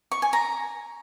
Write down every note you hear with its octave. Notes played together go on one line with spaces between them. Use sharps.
C#6
G#5
A#5